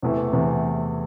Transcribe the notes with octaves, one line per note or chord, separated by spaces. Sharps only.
E2 C3 E3 A3
E2 C3 E3 A3